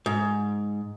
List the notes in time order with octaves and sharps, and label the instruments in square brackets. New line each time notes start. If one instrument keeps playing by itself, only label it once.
[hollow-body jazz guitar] G#2